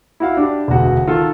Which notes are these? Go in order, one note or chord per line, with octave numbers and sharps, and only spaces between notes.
E4 F#4 F5
D4 G4
E1 D2 F#4
D#3 F4 A4